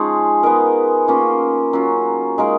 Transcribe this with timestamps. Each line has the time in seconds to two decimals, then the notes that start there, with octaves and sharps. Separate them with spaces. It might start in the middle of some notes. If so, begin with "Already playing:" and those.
Already playing: F3 G#3 C#4 D#4 G#4
0.43 G#3 B3 D#4 A#4
1.08 A#3 C#4 F4
1.73 F#3 C#4 F4
2.38 G#3 D#4 A#4 F5